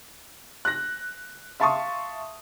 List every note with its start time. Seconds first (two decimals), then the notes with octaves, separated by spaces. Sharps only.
0.65 F#6 A#6
1.60 E5 F5 A5 C6 C#6 D#6